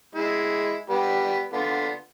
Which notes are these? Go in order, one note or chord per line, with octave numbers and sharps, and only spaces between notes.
G#3 E4
G3 B3 B4
D3 B3 F4